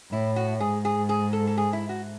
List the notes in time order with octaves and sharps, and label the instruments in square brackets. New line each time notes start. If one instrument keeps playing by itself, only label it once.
[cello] A2 [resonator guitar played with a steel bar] E4
[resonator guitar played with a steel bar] F#4
[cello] G#2 [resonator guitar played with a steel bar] G#4
[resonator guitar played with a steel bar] G#4
G#4
A4
A4
G#4
E4
F#4